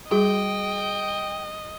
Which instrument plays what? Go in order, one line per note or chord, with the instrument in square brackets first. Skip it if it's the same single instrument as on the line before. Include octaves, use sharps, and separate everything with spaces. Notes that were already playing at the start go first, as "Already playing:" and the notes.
[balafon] G3 [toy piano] F#4 G#4 [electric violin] D#5 [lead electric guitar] G5